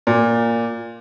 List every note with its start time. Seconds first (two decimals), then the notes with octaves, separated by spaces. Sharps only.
0.07 A#2